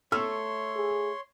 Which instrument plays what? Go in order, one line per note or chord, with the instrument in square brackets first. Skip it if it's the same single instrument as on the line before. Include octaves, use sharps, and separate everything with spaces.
[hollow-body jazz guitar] A3 [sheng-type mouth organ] C#5 C6 [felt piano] E6
[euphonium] G#4